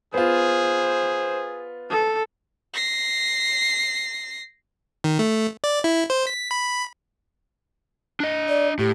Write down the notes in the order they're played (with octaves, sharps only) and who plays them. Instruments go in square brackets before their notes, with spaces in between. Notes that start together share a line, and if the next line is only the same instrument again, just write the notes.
[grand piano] B3 F4 [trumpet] G#4 [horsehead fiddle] C5
[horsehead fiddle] A4
[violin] A#6 C7
[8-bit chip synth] D#3
A3
D5
E4
C5
B6
B5
[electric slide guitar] D4 D#5
[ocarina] D5
[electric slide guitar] A2 [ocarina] G4